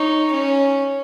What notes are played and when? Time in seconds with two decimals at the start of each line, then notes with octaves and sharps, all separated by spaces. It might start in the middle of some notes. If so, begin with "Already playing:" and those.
Already playing: D#4 C#5
0.33 C#4